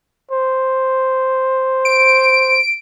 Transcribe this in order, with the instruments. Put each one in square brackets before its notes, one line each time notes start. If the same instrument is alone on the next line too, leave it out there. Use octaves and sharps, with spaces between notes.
[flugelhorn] C5
[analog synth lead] D7